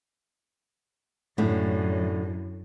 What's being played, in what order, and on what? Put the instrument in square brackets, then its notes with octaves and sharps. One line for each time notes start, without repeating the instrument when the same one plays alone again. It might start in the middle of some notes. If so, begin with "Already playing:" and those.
[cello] F#2 [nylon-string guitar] A2 D3 G4